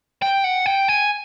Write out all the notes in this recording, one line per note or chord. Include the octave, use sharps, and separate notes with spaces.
G5
F#5
G5
G#5